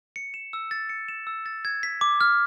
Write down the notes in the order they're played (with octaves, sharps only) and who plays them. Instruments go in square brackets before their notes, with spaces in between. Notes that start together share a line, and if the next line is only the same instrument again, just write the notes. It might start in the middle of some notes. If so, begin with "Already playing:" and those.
[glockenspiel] C#7
E7
E6
A6
C#7
E7
E6
A6
G#6
B6
D6
F6